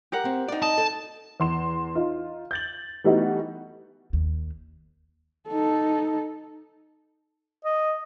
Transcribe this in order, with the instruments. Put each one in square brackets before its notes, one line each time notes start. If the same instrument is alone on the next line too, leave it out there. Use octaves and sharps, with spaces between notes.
[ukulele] G4 A#4 F#5
[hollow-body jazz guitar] C4
D#4 D5
[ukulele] D#5 [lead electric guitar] A5
[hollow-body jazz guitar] A4
[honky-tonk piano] E2 C6 E7
D#4 F4
G6 A6 F#7
E3 G3 A3 B3 D#4 F#4
[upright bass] D#2
[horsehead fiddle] D#4 A4
[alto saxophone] D#5